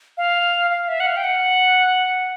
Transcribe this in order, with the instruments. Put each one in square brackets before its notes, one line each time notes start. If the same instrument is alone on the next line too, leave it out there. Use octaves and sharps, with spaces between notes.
[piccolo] F5
F5
E5
F#5
F5
G5
F#5